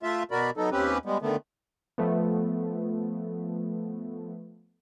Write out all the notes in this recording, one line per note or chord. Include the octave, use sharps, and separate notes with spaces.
A3 F4 E5
B2 F#4 A#4 D5 B5
F#3 B3 D#4 A4
D#2 C4 C#4 G4 B4
G3 G#3 B3
D3 D#3 A3 B3
F3 A3 B3